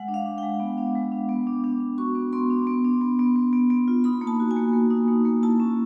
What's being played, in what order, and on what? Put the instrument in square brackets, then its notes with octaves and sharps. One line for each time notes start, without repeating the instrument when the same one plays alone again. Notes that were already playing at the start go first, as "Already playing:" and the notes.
Already playing: [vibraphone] G#3 F#5
D4
F5
D4
G#3 G5
B3
D4
G#3
D4
B3
D4
D4
D4
F#4 C#6
B3
B3 C6
D4
B3
D4
B3
B3
B3
B3
B3
F4
D#4 B5
A#3
A5
F#4
G#5
A#3
A#3
D#4
A#3
A#3
E4 A5
C#4